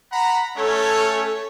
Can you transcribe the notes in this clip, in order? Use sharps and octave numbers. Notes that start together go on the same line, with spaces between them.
F#5 A#5 B5
A3 C#4 A4 C#5